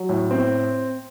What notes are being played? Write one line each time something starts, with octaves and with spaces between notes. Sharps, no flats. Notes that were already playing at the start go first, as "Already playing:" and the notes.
Already playing: F#3
A2
C4